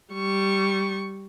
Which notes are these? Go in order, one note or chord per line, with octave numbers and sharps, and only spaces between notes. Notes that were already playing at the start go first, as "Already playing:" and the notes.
G3 C#6